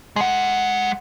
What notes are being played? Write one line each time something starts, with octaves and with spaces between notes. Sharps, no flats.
G#3 F#5